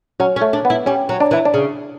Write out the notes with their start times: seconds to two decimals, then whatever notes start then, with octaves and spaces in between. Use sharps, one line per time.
0.20 F#3 C#4
0.36 C#4
0.41 A3
0.53 D4
0.65 B3
0.70 E4
0.86 G3 C#4
1.09 F#3
1.20 D4
1.31 E3 E4
1.45 D4
1.54 C#3